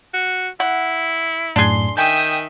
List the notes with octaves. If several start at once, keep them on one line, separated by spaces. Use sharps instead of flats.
F#4
E4 F#5
F#2 A2 D4 G#4 C6
D#3 E5 G5 G#5 D#6 G6